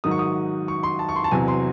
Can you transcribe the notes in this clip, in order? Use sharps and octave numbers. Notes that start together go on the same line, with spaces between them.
G#2 D#3 F#3 D#6
C#6
D#6
C#6
C6
A5
C#6
C6
A5
E2 C3 F#3 G#5
C6